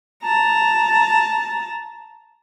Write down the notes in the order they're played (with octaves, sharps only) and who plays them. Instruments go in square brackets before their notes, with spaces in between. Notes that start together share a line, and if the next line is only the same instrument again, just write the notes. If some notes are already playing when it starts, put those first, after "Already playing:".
[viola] A5 A#5